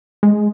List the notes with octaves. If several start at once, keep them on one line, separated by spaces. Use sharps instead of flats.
G#3